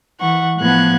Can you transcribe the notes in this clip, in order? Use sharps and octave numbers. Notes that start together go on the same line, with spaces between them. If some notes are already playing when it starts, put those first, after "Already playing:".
E3 F#5 C#6
A2 F3 B3 F#6 G#6